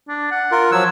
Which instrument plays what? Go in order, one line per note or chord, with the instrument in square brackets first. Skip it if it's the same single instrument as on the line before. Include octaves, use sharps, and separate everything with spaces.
[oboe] D4
F#5
[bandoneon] F4 A#4
[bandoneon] F3 F#3 E6 [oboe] C#5